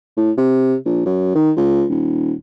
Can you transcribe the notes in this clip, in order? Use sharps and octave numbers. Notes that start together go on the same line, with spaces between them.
A2
C3
A#1
F#2
D#3
C#2
D#1